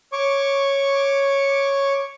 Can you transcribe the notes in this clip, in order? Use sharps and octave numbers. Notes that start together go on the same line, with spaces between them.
C#5 C#6 D6